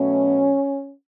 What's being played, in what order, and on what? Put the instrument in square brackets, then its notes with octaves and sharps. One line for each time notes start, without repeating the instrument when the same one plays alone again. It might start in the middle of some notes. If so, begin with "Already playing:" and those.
Already playing: [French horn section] B2 F#3 A3 C#4